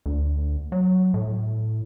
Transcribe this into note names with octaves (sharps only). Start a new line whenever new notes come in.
D2
F#3
A2